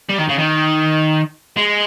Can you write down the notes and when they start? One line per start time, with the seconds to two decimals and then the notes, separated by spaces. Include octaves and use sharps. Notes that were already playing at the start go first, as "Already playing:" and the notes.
0.09 G3
0.19 D#3
0.29 C#3
0.39 D#3
1.57 G#3